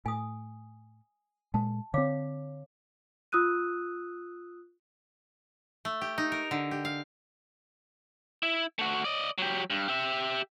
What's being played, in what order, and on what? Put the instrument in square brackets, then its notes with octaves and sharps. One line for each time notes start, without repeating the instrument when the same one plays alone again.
[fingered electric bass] A2 [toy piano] G#5 D#6
[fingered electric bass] A#2 G#3 [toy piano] A5
[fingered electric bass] D3 C4 [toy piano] C#5 F5 D6
[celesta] F4 D#6 E6 F#6 D#7
[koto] A3
G4
D#4
A#4
D3
G4
F5
[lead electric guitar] E4
A3 F#4
D5 D#5
F#3 G4
G2
G4 E5